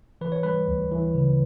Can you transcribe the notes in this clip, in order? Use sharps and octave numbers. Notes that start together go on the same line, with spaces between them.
E3 B4
C#5
G3 B4
D2
E3
C#3